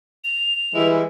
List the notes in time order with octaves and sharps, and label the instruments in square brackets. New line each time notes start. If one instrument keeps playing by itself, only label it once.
[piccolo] F7
[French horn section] E3 [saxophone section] G3 G#3 E4